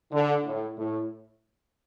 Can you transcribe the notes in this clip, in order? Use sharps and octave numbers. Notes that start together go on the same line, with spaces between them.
D3
A2
A2